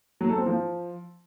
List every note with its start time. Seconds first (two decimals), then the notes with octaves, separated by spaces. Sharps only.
0.21 F#3
0.29 A4
0.38 C4
0.46 F3